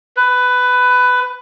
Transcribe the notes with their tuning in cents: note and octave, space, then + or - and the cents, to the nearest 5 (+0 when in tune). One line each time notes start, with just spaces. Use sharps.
B4 +15